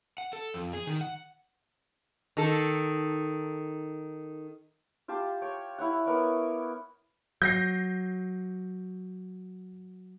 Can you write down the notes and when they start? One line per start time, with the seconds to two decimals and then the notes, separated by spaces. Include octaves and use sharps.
0.18 F#5
0.33 A4
0.54 F2
0.73 G#4
0.87 D#3
1.01 F#5
2.37 D#3 A4
5.08 F4 G4 A5 C6
5.42 C#5 G5
5.78 E4 C#5 F#5
6.06 B3 A#4 C#5 D5
7.42 F#3 G6 A#6 C7